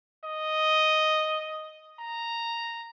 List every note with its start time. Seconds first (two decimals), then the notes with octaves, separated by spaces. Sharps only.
0.24 D#5
2.00 A#5